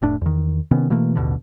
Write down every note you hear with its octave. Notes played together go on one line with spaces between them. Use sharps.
F1 A2 D4
E2 D#3
C3 D#3 B3 C#4
B2 E3 A3 A#3
A1 D#2 B2 D3